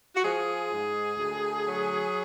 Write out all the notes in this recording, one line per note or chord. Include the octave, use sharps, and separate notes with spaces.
F#4
F3 G#4
G#2
D2
F#3